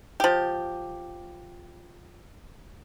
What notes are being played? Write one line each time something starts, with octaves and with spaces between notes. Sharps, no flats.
F3 G4